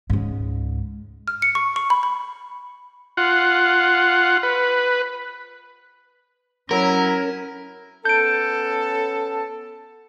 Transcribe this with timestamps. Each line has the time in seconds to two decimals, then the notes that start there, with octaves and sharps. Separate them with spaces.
0.10 C#2 G#2
1.28 F6
1.42 C#7
1.55 C#6
1.76 C#6
1.90 B5
2.03 B5
3.17 F4 F#5
4.43 B4
6.71 F#3 C#4 E4 A#4
8.05 B3 C#4 A4 G6 D7